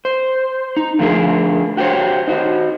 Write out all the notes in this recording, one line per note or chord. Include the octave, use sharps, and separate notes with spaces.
C5
D#4
D3 F3 A3 G#4 A#4
F#4 G4 A4 C5 C#5
D#4 F#4 C5